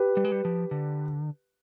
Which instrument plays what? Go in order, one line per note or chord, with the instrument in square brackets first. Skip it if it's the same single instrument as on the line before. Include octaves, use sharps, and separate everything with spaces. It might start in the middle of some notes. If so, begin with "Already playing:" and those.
Already playing: [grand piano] G4 B4
[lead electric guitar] G3
G#3
G3
F3
D3